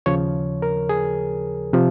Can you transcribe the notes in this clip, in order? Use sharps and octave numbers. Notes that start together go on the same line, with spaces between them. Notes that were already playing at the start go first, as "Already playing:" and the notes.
D#2 C#3 F3 C#5
A#4
G#4
C3 F3